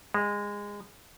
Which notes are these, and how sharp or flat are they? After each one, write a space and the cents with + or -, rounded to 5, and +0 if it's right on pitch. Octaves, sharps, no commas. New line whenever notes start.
G#3 -20